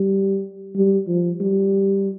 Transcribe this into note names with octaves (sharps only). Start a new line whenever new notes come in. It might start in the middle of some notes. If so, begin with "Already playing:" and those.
Already playing: G3
G3
F3
G3